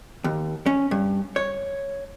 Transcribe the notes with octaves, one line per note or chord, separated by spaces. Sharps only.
D#2
C#4
G2
C#5